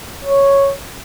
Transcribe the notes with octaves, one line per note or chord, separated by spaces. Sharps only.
C#5